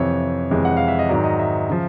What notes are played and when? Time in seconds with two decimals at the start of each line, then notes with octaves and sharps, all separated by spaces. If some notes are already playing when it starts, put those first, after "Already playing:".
Already playing: F2 C3 E3 C#5
0.51 F2 C3 E3 G#3
0.65 F#5
0.77 F5
0.88 E5
0.99 D#5
1.09 G#2 D#3 F#3 D5
1.24 D#5
1.39 E5
1.69 C#3 F3